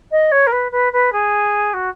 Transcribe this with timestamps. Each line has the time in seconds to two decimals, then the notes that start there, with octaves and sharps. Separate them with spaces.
0.11 D#5
0.32 C#5
0.47 A#4
0.52 B4
0.72 B4
0.93 B4
1.13 G#4
1.74 F#4